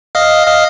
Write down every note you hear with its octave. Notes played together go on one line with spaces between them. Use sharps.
D#5 F5
D#5 F5